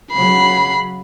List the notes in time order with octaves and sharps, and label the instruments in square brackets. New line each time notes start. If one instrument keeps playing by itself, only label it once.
[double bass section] C#3 F#3 [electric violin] B5 C7